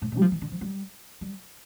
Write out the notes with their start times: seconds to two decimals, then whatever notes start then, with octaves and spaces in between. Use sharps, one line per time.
0.02 A2
0.12 A#2
0.17 G3
0.21 F3
0.32 E3
0.41 D3
0.52 F3
0.61 G3
1.21 G3